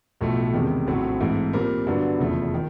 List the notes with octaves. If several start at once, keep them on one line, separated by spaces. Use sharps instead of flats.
B1 A2 F3 A3
E2 C3 D#3 G#3 C#4
A#1 A2 F#3 A3 C4
G#2 E3 A3 C4
A#2 G3 C4 F4 A#4
G2 D3 F#3 B3
F1 E2 C#3 F3 A3
D#3